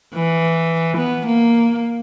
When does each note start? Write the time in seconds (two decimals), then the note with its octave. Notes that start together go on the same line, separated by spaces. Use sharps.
0.14 E3
0.98 B3
1.27 A#3